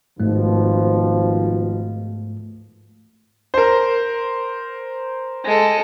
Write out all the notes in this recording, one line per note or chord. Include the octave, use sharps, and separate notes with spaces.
G#1 G#2 B2 F3 A3
A#4 C5
G#3 A4